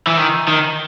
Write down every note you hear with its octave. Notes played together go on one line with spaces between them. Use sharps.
E3
D#3
D#3